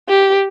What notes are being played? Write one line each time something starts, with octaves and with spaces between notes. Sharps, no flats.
G4